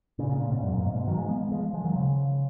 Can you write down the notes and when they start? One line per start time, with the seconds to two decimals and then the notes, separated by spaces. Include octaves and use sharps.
0.19 A#2 C#3
0.29 A#2 C#3
0.40 A#2 C#3
0.51 G#2 B2
0.63 F#2 A#2
0.73 F#2 A#2
0.85 G#2 B2
0.95 G#2 B2
1.07 D#3 F#3
1.18 F3 G#3
1.29 G#3 B3
1.51 F3 G#3
1.73 F3 G#3
1.84 D#3 F#3
1.96 C#3 F3